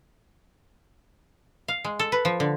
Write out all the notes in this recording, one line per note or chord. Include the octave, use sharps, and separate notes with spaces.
F5
G#3
A4
B4
F3
D3